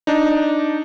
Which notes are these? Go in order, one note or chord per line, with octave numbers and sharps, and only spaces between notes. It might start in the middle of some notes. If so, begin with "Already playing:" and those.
D4 D#4